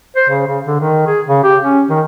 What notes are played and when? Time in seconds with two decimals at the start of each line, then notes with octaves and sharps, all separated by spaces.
0.16 C5
0.29 C#3
0.47 C#3
0.65 D3
0.80 D#3
1.07 G#4
1.27 C#3
1.44 G4
1.63 C#4
1.90 D#3